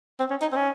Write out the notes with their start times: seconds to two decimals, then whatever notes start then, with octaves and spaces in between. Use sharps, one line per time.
0.20 C4
0.30 C#4
0.41 D#4
0.52 C4
0.56 C#4